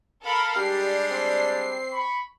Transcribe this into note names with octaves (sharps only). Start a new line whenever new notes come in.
A4 A#4 F5 B5
G3 G#3 D4 G4 C7
C4
B5 C#6